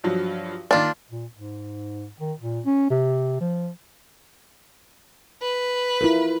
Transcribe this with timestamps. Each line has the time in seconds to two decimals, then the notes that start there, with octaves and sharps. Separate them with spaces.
0.04 G2 F3 F#3
0.71 D#3 A#3 D4 F4
1.11 A#2
1.35 G#2
2.20 D#3
2.39 A#2
2.66 C#4
2.90 C3
3.40 F3
5.42 B4
6.01 E4 F4 A#4